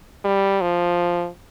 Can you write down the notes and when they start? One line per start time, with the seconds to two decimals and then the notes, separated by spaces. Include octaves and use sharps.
0.24 G3
0.61 F3